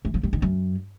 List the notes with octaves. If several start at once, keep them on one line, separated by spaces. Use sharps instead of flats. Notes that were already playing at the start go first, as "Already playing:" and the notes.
E3
F3
G2
D#3
F#2